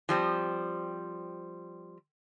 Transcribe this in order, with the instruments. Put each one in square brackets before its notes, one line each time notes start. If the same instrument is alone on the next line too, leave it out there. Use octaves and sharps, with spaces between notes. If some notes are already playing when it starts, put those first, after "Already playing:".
[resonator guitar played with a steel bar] F3 G3 C4